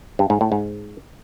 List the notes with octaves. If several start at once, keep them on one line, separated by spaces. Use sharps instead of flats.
G2
G#2
A2
G#2